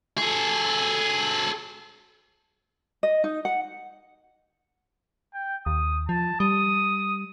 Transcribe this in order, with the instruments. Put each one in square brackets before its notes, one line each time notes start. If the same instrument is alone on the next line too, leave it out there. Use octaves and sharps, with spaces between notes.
[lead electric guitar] G#4 A4
[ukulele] D#5
D#4
F#5
[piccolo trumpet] G5
[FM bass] D#2 [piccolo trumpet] D#6
[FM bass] F3 [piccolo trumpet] A5
[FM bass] G3 [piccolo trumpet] D#6